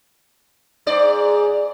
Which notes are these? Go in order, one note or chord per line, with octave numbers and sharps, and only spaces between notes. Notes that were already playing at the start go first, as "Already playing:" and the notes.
G#2 D5